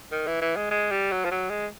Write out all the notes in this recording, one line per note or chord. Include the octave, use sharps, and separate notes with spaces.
D#3
E3
E3
G#3
G#3
G3
F#3
F3
F#3
G#3